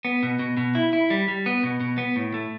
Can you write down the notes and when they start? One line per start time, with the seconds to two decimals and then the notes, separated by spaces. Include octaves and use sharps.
0.05 B3
0.23 B2
0.39 B2
0.57 B2
0.75 E4
0.93 E4
1.10 G3
1.28 G3
1.46 B3
1.63 B2
1.80 B2
1.98 B3
2.16 A2
2.34 A3